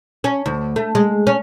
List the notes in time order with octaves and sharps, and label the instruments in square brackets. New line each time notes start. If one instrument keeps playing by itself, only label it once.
[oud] C#4
D2
A3
G#3
C#4